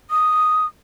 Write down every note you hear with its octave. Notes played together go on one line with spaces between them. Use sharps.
D#6